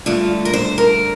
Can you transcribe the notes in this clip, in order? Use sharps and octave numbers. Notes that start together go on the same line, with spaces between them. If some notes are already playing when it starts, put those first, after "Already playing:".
G2 D3 A3 F4
A#4
C5
A#4